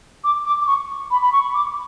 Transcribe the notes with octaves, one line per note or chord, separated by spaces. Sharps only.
D6
D6
D6
C#6
B5
B5
C#6
D6